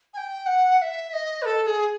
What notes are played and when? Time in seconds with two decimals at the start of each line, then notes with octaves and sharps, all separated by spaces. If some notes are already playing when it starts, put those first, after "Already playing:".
0.14 G#5
0.17 G5
0.46 F#5
0.78 F#5
0.82 E5
1.09 E5
1.14 D#5
1.42 B4
1.46 A4
1.63 A4
1.67 G#4